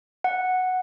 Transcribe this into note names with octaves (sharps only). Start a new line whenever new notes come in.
F#5